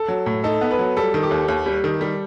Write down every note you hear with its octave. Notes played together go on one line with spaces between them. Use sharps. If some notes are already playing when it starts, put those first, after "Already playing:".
Already playing: A4
F#3
A2
D#4 A4
B3
B4
F#3
G3 A4
D#3
G4
D#2
D#2
G3
D#3
G3